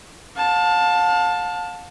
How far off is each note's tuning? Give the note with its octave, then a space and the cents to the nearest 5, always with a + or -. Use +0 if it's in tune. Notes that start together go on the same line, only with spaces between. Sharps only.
F5 +35 A5 +0